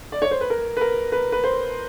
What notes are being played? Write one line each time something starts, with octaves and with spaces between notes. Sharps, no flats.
D5
C#5
C5
B4
A#4
B4
A#4
B4
B4
C5